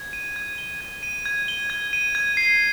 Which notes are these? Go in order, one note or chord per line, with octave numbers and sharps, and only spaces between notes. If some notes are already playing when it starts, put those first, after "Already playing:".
Already playing: G#6
D#7
G#6
G7
G#6
D#7
G#6
G7
G#6
D#7
G#6
C7